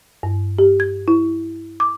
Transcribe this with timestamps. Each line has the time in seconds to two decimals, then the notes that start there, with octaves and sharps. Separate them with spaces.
0.23 G2
0.59 G4
0.80 G#6
1.08 E4
1.80 D6